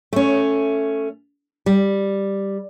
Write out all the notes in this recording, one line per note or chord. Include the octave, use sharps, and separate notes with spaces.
A3 C#4
G3